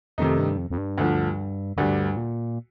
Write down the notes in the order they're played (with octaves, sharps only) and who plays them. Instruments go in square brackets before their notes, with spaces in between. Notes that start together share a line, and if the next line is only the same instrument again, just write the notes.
[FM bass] F2 [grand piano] C3 D#3 A3 D#4
[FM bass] G2
F2
F2
G2
[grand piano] D2 D3 F3
[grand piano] D2 D3 G3 [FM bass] G2
[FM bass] A#2